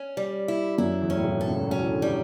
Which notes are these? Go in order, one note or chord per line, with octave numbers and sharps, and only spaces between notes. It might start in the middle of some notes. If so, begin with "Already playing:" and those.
Already playing: C#4
G3
E4
F#2 F#3 E4
E2 E3
C#4
A2
B1 B2
A4
C#2 C#3
F#3 C#4
E3
D3
E3 G3